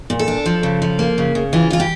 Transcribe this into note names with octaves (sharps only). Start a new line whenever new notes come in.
A#2
A4
D4
F3
C#3
F3
A#3
C#3
C#3
E3 F4
E3 F4
G4